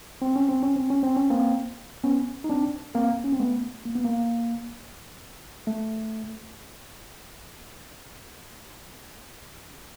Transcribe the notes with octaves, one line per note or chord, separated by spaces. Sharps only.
C4
C#4
C4
C#4
C4
C#4
C4
C#4
A#3 C4
B3 C#4
D#4
C4 D4
A#3 C4
C#4
C4
A3 B3
A#3
B3
A#3
A3